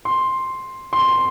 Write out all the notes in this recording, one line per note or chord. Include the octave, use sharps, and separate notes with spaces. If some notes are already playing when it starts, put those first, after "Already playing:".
C6
C6